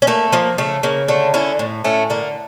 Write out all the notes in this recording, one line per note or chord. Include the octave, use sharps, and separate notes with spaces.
C#4
A3 A#3
F3 A#3
C#3 A3
C#3 A#3
D3 A3
D3 C#4 E4
A2
A2 A3 C#4
D3 A#3